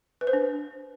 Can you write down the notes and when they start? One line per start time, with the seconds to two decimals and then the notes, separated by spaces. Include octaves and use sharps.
0.21 B4
0.27 C5
0.33 D4